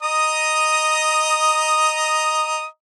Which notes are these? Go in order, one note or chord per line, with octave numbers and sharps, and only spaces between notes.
D#5 A#5 D#6